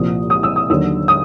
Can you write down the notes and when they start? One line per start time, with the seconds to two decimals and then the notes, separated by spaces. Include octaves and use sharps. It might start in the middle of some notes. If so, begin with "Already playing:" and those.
Already playing: C2 A#2 F3 D#6
0.30 D#6
0.43 E6
0.56 D#6
0.70 D#2 D3 F#3 E6
1.08 D#6